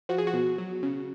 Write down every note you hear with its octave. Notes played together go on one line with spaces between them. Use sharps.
F3 F#4
G#4
F#4
B2
F#3
C#3